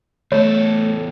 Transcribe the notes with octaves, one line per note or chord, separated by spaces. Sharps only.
E2 A3 A4 C#5